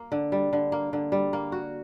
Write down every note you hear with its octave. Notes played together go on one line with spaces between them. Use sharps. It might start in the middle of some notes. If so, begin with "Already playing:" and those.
Already playing: A#3
D3
G3
D3
A#3
D3
G3
A#3
F#4